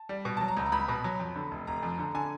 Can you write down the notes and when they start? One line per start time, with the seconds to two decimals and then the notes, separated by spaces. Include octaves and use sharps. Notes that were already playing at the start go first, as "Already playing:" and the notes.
Already playing: A5
0.09 G3
0.25 B2
0.37 F#3 A5
0.48 A#5
0.57 C#2
0.66 A#5
0.72 C#2 B5
0.88 B2
1.04 F#3
1.20 F2
1.36 D3
1.51 F1
1.67 F1 A#5
1.83 F2
1.99 D3
2.15 D3 G#5